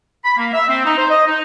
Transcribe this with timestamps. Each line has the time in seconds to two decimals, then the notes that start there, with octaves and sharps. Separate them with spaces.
0.25 B5
0.38 A#3
0.54 E5
0.68 C4
0.85 D#4
0.98 C5
1.10 D#5
1.27 D#4